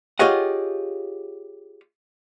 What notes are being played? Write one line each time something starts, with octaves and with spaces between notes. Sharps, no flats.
F4 G4 G#4 C#5 D#5 F#5